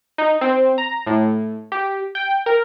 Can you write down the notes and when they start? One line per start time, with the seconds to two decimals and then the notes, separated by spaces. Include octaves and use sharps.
0.18 D#4
0.41 C4
0.78 A#5
1.07 A2
1.72 G4
2.15 G5
2.46 A#4